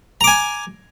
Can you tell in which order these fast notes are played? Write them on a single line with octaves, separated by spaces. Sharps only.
A#5 D6 G#5